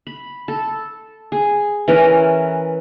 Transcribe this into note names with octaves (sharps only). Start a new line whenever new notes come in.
B5
A4
G#4
E3 C#4 A#4